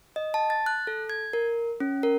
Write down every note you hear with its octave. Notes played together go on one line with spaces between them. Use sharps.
D#5
A5
A6
F#6
A4
G#6
A#4
C#4
A#4